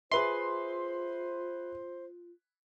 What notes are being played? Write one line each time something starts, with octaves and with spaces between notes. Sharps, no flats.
F4 G#4 B4 C5 E5 C6